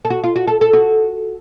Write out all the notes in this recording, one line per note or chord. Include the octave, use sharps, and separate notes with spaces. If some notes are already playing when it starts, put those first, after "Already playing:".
A4
F#4
F4
F#4
A4
A4
F#4